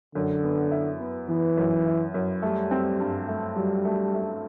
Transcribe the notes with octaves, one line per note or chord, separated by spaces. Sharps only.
F#2 D3
B3
E4
B3
E3 B3
F#2
E4
F#2
G3 A3
C4
G2
A3
F#3 G3
A3
A3